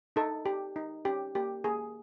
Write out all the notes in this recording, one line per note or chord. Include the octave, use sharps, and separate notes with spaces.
D#4 A4
G4
D#4
C#4 G4
A#3 G4
A#3 G#4